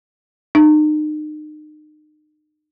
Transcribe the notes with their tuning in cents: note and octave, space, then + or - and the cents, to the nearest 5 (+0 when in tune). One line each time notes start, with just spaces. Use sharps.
D#4 -35